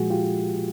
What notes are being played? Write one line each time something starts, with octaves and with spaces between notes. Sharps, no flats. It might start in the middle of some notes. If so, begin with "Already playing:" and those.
Already playing: A#2 F3 G#3 F#4 G#4
F4 G4